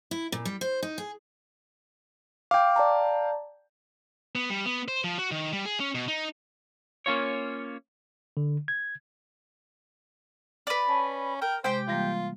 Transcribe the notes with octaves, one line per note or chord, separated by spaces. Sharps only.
E4
A#2
G3
C5
D#4
G#4
F5 G5 D6
D5 A5 A#5
B3
G3
B3
C5
F3
F#4
D#3
G3
G#4
C#4
B2
D#4
A#3 C#4 F4 C#5
D3
G#6
B4 D5
C#4 A5
A#4 G5
C3 G#3 G4 C5 G5
E3 G3 A#3 F4